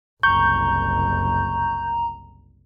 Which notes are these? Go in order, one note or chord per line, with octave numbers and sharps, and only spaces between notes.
F#1 C2 A#5 C#6 G6